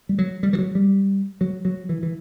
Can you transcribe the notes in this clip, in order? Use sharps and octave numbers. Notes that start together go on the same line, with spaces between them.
G3
F#3
G3
E3
F#3
G3
F#3
F#3
E3
E3